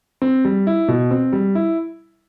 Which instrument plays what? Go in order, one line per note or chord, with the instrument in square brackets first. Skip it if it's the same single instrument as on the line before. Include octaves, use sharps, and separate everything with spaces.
[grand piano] C4
G3
E4
B2
C4
G3
E4